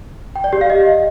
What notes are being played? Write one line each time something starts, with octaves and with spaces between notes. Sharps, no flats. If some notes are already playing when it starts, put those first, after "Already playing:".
G5
D5
G4
F5
D#5